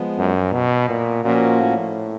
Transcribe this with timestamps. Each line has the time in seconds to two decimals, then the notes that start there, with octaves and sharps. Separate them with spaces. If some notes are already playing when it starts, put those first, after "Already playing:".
Already playing: F3 G#3 B3
0.18 F#2
0.53 B2
0.89 A#2
1.24 A#2 F3 A#3 C#4 F#4
1.60 A2